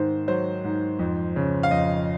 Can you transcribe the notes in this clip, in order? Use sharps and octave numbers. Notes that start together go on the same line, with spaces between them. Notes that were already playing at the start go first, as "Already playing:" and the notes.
Already playing: G#2 D#3 C5
F#3 C5
G#2
F2
C#3
F5
F2 D#5